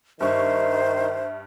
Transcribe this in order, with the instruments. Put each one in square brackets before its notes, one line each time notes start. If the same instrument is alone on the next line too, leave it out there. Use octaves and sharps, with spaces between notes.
[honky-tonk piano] G2 C#6 [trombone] D#3 [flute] C5 [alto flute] E5